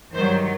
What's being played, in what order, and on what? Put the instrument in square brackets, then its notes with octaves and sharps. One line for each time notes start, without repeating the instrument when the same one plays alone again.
[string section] G2 D#3 F#3 C5